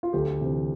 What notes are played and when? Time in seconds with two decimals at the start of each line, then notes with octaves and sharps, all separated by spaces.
0.03 F4
0.13 D2 G4
0.41 C3 E3